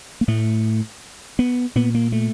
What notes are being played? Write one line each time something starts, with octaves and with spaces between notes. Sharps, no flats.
A#3
A2 A3
B3
A#2 B3
A#3
A3